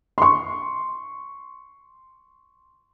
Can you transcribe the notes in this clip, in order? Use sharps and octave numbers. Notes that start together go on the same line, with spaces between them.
C6 C#6